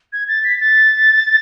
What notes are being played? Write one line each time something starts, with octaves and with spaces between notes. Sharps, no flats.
G#6
A6
B6
A6